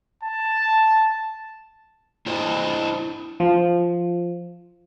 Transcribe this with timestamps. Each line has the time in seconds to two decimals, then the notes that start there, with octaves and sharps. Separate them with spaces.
0.23 A5
2.26 D4 E4 C5 D#5
3.40 F3